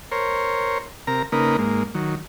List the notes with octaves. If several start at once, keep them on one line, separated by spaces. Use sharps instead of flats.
A#4 C5 C#5
C3 A#4 A#5
C#3 A#3 D#4 A#4 B4
G#2 A#3
D#3 F#3